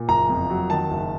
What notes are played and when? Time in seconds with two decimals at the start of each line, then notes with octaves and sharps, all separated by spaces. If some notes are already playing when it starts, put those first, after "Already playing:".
Already playing: A#2
0.08 F#1 A#5
0.29 F2
0.50 F#3
0.70 D#3 A5
0.90 F#1